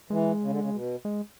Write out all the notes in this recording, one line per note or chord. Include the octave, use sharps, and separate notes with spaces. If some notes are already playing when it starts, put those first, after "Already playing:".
E3 G#3
C#3
D3
C#3
B2
G#3